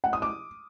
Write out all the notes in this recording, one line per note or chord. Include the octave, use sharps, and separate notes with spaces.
F#5
D#6
D6